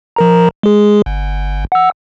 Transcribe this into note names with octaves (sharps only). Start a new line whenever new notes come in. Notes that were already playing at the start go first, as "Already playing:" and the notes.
F3 A#4 A#5
G#3 G#4
G1
F#5 E6